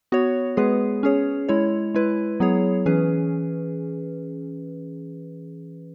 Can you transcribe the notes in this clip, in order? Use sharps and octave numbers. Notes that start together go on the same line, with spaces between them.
B3 F#4 C#5
G#3 B3 G#4 B4
C#4 G#4 C#5
G#3 E4 C#5
G#3 E4 B4
F#3 B3 E4 G#4 C#5
E3 C#4 G#4 B4